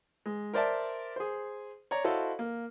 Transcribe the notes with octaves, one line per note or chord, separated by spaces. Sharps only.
G#3
A#4 C5 D5 E5 A5
G#4 C5
C#5 D5 A#5
E4 F#4 A4 C5 D#5 F5
A#3